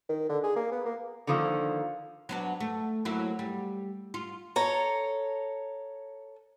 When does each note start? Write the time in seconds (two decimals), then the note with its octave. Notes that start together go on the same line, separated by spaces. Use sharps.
0.09 D#3
0.29 D3
0.43 G#4
0.56 A#3
0.71 B3
0.85 A#3
1.27 D3 D#3 F3 A#3
2.29 F#3 B3 D4
2.60 A3
3.05 F#3 A#3 E4
3.39 G3
4.14 F4
4.56 A4 C#5 A#5